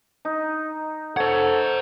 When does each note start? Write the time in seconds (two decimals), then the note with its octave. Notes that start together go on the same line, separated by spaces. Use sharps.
0.25 D#4
1.17 A4 C5 C#5 F#5